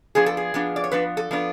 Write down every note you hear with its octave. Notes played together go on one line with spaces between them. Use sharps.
F3 B3 D4 G#4
A4
G#4
F3 B3 D4
D5
C#5
F3 B3 D4 B4
A4
F3 B3 D4